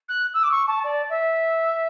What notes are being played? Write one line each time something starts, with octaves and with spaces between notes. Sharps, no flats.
F#6
E6
D6
C#6
A5
D5
E5